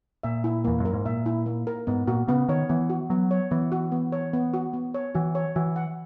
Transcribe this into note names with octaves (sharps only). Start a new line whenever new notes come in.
A#2 E5
E4
E2 A#3
F#2
A#4
G#2
A#2 E5
E4
A#3
A#4
G#2 B3
A#2 F#4
C#3 B3
D#3 C#5
E3 B3
F#4
F#3 B3
C#5
E3 B3
F#4
B3
C#5
B3
F#4
B3
C#5
E3 F#4
C#5
E3 F#4
F#5